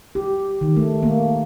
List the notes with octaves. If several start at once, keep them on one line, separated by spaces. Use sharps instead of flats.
G4
D#3
A3
A#3